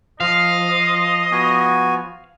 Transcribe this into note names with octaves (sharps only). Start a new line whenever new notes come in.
F3 D#5 F5
B3 F#4 G#5